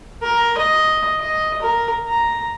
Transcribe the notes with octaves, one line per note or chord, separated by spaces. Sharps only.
A#4
D#5
D#5
A#4
A#5